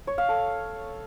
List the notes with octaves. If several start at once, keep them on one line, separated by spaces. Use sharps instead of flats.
C#5
F5
A4